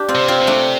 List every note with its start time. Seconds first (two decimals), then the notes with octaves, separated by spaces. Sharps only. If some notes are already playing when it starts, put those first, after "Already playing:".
Already playing: D4 G4
0.09 C4 F4
0.15 C3
0.28 C4 F4
0.41 C3
0.47 A3 D4